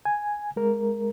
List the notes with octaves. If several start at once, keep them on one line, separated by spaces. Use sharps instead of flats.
G#5
G#3 A#4